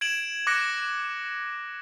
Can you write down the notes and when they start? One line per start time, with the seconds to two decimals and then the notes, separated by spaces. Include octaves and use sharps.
0.01 G#6 D7 E7 F#7
0.47 D6 F#6 A#6 C#7 D7